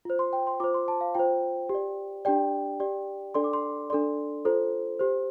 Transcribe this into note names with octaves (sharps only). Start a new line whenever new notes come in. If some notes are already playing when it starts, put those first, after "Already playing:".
F4 C5
C6
G5
C6
F4 C5 D6
C6
A5
F5
F4 C5 G5
G4
D5
D4 G4 D5 G5
G4 D5
D4 A4 D5 C6
D6
C6
D4 A4 D5 C6
F4 A4 C5
G4 C5